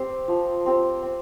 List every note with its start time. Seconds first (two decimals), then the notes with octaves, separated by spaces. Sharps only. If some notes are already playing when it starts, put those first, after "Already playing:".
Already playing: C4 G4 C5
0.28 F3
0.66 C4 G4 C5
1.02 C4